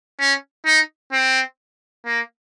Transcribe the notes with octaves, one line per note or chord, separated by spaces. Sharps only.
C#4
D#4
C4
A#3